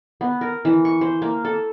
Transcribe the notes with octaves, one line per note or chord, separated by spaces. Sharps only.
B3
A#4
E3
C#6
C5
A#3
A4